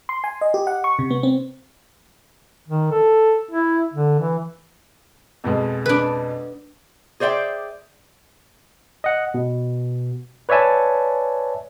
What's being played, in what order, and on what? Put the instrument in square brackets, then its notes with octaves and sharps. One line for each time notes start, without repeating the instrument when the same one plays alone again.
[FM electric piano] C6
G#5
D#5
G4
F#5
C#6
C3
B3
C4
[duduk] D#3
A4
E4
D3
E3
[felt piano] F2 B2 G#3
[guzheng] D4 B4
[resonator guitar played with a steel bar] G#4 C5 D5 E5 G5
[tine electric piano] D#5 F#5
B2
B4 C#5 D5 E5 G#5 A5